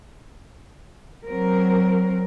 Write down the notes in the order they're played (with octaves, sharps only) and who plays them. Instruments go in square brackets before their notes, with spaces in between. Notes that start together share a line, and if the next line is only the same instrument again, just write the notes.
[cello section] F#3 C4 A#4